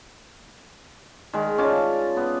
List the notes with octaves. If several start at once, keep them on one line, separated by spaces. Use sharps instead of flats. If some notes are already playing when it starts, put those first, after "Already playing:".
D#3 G#3
C#4 F4 D5 A5
B3